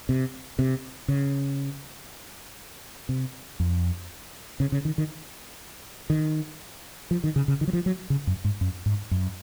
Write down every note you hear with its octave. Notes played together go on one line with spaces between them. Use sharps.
C3
C3
C#3
C3
F2
C#3
C#3
D#3
D#3
D#3
F3
D#3
C#3
C#3
D#3
F#3
F3
F#3
C#3
F#2
G#2
F#2
G#2
F#2